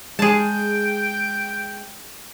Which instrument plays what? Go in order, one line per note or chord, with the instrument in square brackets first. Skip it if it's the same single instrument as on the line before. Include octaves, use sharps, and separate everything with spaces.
[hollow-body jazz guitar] G#3 [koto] G#4 A5 [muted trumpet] G5